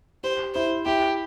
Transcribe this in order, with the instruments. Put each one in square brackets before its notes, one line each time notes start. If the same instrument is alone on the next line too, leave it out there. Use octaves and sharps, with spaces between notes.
[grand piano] G4 [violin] C5
[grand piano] E4 [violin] C5
[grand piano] E4 [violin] G4